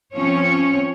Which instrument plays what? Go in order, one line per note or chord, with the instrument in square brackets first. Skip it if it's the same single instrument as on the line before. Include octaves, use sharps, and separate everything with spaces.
[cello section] F3 C4 C#4 C#5